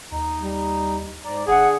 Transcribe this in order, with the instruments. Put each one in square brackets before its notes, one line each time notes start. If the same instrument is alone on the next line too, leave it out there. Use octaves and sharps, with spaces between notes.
[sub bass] D#2 [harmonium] D#4
[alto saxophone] G3
[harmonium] G#2 D5 A#5
[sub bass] G1 [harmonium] D3 [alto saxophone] G#4 [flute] F#5